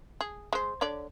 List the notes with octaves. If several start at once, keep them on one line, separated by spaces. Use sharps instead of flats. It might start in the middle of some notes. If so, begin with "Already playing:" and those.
G#4
G#3 C5
D3 C#5 D5